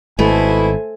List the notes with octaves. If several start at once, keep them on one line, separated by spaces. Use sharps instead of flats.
G#1 B2 A3 E4 C5 G#5